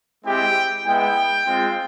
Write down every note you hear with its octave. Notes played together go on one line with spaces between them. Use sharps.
G#3 C4 E4 G4 G5
G#3 B3 E4 G5
G#3 C4 F4